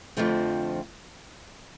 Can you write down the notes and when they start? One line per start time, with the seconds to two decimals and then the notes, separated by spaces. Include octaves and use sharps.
0.17 F2 D3 F3 A3 C4